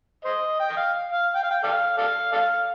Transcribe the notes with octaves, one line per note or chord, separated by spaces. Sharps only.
C5 D#5
G5
D#5
F5
F5
G5
F5
G5
A4 D5 F5
A4 D5 F5
A4 D5 F5